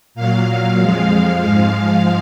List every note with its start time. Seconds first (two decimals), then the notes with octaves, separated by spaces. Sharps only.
0.15 A#2 F#3 F5
0.79 F2 F3 G#3
1.43 G#2 F3 G#3